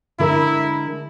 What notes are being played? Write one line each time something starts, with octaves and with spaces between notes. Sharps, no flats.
D3 G#3 E4 A#4